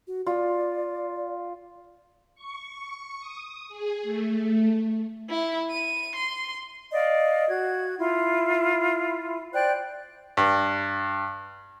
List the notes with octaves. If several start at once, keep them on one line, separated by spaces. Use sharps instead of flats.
F#4
F4 D5
C#6
D#6
G#4
A3
E4
D#7
C6
D5 D#5 F5
F#4 G#6
E4 F4
C5 D5 G5 F#6
G2